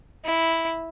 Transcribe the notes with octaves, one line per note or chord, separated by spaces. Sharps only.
E4